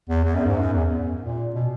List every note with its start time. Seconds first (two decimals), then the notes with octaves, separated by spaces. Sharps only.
0.09 E2
0.25 E2
0.35 F#2
0.46 G#2
0.57 F#2
0.73 E2
1.21 A#2
1.54 B2